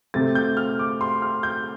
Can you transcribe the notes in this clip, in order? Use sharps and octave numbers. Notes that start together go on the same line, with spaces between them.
C3 A3 C4 A6
G6
F6
D6
C6
F6
G6